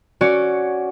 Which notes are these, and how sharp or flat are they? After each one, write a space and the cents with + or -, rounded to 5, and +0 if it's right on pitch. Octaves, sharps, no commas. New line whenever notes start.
C#4 +0 F#4 +5 D5 -10